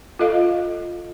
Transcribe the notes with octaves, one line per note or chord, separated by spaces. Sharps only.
F4 A4 D#5 F5